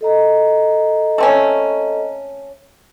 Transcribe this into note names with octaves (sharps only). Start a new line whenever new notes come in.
A4 D#5 A#5
A3 C4 C#4